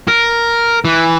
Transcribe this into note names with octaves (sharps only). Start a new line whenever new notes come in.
A#4
E3